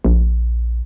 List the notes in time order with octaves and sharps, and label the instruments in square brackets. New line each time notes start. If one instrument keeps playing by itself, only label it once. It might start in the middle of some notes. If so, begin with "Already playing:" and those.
[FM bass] A#1